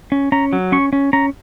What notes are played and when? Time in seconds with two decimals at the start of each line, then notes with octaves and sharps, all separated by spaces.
0.12 C#4
0.32 C#4 A#5
0.53 F#3
0.72 C#4 C#6
0.93 C#4
1.13 C#4 A#5